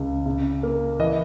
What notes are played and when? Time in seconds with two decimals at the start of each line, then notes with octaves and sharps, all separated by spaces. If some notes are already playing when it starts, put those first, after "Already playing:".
Already playing: C#2 C#3
0.26 C#3
0.63 A#3
0.99 E3 D#5